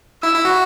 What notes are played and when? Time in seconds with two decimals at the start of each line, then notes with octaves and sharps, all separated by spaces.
0.23 E4 E6
0.34 E4
0.45 F#4